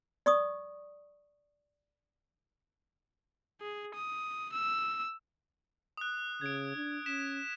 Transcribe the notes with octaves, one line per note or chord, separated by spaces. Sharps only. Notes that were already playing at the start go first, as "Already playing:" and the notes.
D5 C#6 D#6
G#4
D#6
E6
D#6 F#6
C#3 G#6 D7
D4
C#4 B6 E7